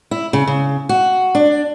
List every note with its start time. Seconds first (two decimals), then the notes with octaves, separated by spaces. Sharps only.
0.11 E4
0.33 C#3
0.47 C#3
0.89 F#4
1.35 D4